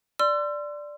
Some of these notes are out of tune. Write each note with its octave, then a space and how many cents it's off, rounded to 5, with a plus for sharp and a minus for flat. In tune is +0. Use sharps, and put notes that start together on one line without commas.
D5 +0 C6 -10 E6 +40